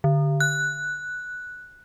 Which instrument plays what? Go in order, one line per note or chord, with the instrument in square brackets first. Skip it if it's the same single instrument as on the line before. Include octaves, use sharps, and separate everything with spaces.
[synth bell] D3
F#6